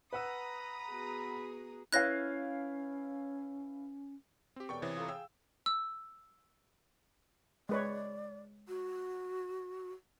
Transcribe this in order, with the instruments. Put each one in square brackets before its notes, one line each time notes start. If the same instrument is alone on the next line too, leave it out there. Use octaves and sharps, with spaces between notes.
[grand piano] B4 F#5 E6 [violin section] A#5 D#6 [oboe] B5
[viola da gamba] B3 F#4 G#4
[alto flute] C#4 [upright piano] E4 B4 F5 [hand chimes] C#5 G#6 [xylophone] F#6 A#6
[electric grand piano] C4 G4
[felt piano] E1 B3 D5 [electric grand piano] G5 C#6
[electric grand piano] C3 E3 [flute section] C#5 D#6 [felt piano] A6
[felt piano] F4 A4 A#5
[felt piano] G#4 F5 G5 [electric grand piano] E6
[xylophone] E6
[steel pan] G#3 B4 C#5 [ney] D5
[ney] F#4